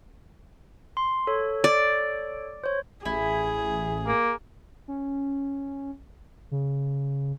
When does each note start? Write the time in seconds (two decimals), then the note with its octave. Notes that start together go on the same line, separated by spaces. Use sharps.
0.97 C6
1.27 A4 C#5
1.64 D5
2.64 C5 C#5
3.05 A1 E4 G#4
4.07 A#3
4.88 C#4
6.51 C#3